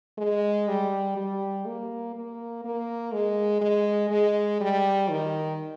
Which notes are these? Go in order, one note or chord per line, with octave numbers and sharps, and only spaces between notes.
G#3
G3
G3
A#3
A#3
A#3
G#3
G#3
G#3
G3
D#3